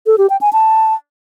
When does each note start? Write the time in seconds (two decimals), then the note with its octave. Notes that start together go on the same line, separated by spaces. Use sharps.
0.06 A4
0.18 G4
0.30 G5
0.41 G#5
0.53 A5